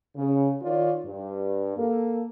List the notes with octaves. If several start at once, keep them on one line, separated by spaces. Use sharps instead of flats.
C#3
D#3 F4 C#5 D5
G2
A#3 A4